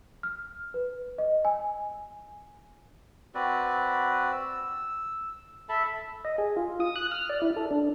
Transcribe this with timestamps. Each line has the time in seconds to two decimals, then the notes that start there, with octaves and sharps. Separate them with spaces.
0.23 F6
0.74 B4
1.18 D#5
1.45 G#5
3.35 C4 F#4 B4 D5
4.32 E6
5.69 A4 E5 A5 B5
6.25 D#5
6.38 G#4
6.57 F4
6.80 D#6
6.96 F#6
7.11 F6
7.29 D5
7.42 E4
7.56 A4
7.71 D4